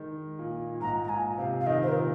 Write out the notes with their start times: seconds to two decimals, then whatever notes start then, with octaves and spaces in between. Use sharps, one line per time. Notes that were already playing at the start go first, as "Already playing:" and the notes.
Already playing: D#3 G#3
0.39 A#2
0.75 A#2
0.80 G#2 A#5
1.04 A#5
1.09 A#2 G#5
1.38 C3 F5
1.61 F5
1.66 D#3 D#5
1.83 C5
1.88 A#4
1.95 A#2